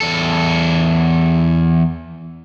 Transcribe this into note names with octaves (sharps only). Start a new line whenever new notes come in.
E2 A4